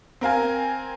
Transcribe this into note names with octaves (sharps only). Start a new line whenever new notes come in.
C4 A#4 F5 G#5